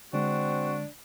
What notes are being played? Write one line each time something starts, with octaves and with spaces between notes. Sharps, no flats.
D3 G#3 C4 D4 F#4